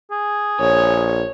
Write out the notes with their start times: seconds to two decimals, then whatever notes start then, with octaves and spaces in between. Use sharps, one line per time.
0.11 G#4
0.60 A#1 C#5